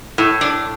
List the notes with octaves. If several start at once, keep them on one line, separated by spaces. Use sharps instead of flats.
A2
D4